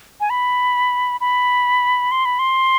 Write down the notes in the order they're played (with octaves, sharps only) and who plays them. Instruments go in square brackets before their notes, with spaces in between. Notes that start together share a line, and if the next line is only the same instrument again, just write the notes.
[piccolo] G#5
B5
B5
C6
B5
C6